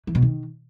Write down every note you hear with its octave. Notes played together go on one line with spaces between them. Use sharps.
E3
B2
D#3